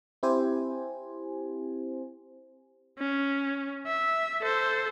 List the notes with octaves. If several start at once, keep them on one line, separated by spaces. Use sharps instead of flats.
C4 E4 G4 C5 G#5
C#4
E5
A4 C5